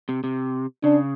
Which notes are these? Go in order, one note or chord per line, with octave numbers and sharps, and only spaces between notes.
C3
C3
C#3 D4